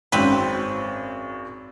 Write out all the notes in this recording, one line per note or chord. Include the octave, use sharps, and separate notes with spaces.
G#1 F#2 C4 B4